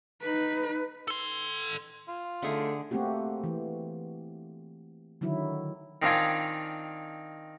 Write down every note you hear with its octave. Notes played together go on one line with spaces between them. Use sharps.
D#4 B4
A4 C6
F4
D3 A3 D#4 G#4
A3 A#3 C4 F#4 G4
E3
D3 D#3 F#3 E4
D#3 C4 D4 D#4 F4 G#5